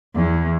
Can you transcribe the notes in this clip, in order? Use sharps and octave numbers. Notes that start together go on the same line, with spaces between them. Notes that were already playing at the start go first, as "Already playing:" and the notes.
E2